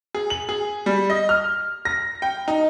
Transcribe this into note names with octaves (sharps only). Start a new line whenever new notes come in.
G#4
F#7
G#4
G3
D#5
F6
A#6
G5
D#4